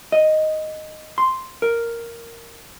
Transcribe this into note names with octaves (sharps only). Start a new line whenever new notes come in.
D#5
C6
A#4